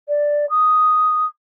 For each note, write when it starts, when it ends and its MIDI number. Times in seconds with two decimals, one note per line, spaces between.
0.08 0.46 74
0.50 1.25 87